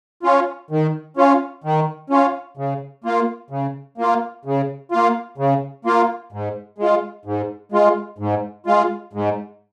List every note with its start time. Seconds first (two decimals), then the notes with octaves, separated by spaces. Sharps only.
0.23 C#4 F4
0.71 D#3
1.17 C#4 F4
1.64 D#3
2.10 C#4 F4
2.57 C#3
3.04 A#3 F4
3.50 C#3
3.98 A#3 F4
4.45 C#3
4.92 A#3 F4
5.38 C#3
5.85 A#3 F4
6.32 G#2
6.78 G#3 F4
7.25 G#2
7.72 G#3 F4
8.18 G#2
8.66 G#3 F4
9.13 G#2